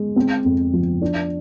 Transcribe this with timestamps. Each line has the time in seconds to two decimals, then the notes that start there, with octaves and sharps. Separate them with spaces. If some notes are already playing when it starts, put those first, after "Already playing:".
Already playing: G#3
0.16 C4
0.45 F2
0.73 F3
1.02 D4